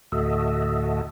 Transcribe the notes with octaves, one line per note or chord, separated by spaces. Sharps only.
D2 A2 F#4 A4 D#5 E5